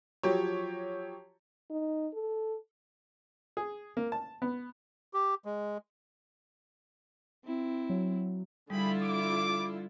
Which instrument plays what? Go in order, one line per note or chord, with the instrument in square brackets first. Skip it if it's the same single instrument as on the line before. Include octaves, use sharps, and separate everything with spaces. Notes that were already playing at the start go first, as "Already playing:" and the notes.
[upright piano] F3 F#3 G4 C#5
[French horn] D#4
A4
[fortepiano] G#4
A#3
A5
B3
[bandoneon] G4
G#3
[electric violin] C4 E4
[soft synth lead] F#3
[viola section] D3 E4 F4 [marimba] G3 [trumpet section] G4 G#4 B5
[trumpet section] D6